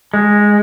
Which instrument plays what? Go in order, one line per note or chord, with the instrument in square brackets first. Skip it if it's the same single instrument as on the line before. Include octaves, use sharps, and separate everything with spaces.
[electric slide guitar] G#3